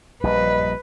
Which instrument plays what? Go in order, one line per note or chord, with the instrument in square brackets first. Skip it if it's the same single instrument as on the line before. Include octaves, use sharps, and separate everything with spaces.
[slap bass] A#1 G3 [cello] B4 [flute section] D#5